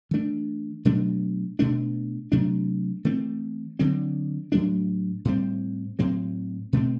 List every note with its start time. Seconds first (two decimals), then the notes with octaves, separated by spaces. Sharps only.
0.11 E3 A3 D4
0.85 B2 F#3 A3 D4
1.59 B2 A3 D4
2.32 C3 F#3 A3 D4
3.05 E3 A3 C4
3.79 D3 F#3 C4
4.52 A2 F#3 A3 D4
5.25 A2 G3 C4
5.99 A2 F#3 C4
6.73 B2 A3 C4